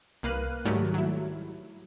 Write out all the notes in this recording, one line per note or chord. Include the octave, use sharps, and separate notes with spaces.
C2 A#3 B4 F5 F#6 D#7
G#2 D#3 F#3 G3 A3
F#3 E4